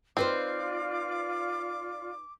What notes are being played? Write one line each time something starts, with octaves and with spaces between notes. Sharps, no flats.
C4 D#4 F4 B4 C5 D5 D6